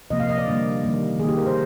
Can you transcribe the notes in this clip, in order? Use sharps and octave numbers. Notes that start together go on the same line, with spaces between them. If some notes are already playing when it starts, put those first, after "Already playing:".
C3 F3 A#3 D#5
F5
D#5
D5
D3 G3 A#3
D#3 G3 A#3
D#3 A#3 G#4
G4
A#4
C5